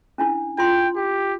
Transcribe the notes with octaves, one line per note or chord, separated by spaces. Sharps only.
C#4 D4 E4
F4 G5 C6
G4 G5